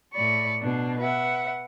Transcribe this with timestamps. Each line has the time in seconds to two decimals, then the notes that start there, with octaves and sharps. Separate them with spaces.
0.13 A2 D5 B5 C#6
0.61 B2 D4
1.00 B4 E5 F#5